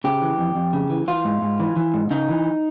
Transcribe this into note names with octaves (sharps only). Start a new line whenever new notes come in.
C#3 G4
E3
F2
F2
C#3
E3
E3 F4
G#2
G#2
E3
E3
G#2
C#3 D#4
E3